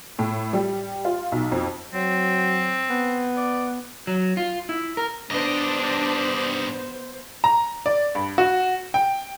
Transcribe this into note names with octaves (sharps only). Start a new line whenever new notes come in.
A2
G3
F4
B1
F2
F#3 C4
B3
D5
F#3
F4
E4
A#4
G2 B3 D4 C5 D#5
A#5
D5
G2
F#4
G5